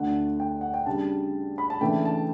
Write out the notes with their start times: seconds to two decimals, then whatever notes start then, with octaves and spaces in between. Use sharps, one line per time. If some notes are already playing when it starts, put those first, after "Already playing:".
Already playing: D2 D3 A3 D4 F#5
0.40 G5
0.61 F#5
0.74 G5
0.86 C#3 G3 D4 A5
1.58 B5
1.70 A5
1.81 C#3 E3 A3 D4 G5
2.05 A5